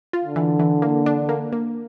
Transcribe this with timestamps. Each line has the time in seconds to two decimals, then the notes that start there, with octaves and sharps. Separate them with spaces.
0.13 F4
0.24 D3
0.36 E3
0.59 E3
0.82 A#3
1.06 D4
1.29 A#3
1.52 A#3